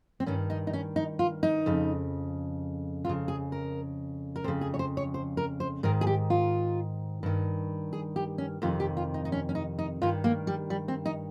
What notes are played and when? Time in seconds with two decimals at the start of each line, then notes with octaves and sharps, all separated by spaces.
0.20 C4
0.26 G2 D#3 C#4
0.50 D#4
0.67 D#4
0.73 C#4
0.96 D#4
1.19 F4
1.43 D#4
1.66 F2 C#3
3.05 F2 C#3 F4
3.28 G#4
3.52 A#4
4.36 A#4
4.44 F2 C#3 C5
4.61 G#4
4.74 C#5
4.79 C5
4.97 C#5
5.14 C5
5.37 A#4
5.60 C5
5.83 G#2 D#3 A#4
6.01 G#4
6.07 G4
6.30 F4
7.23 G2 D#3
7.93 G#4
8.16 G4
8.38 C#4
8.62 F2 C3 D#3 F4
8.80 G4
8.97 F4
9.14 D#4
9.25 D#4
9.32 C#4
9.49 C#4
9.55 D#4
9.79 D#4
10.02 G2 D#3 F4
10.24 A#3
10.47 G3
10.70 G3
10.88 C4
11.06 D#4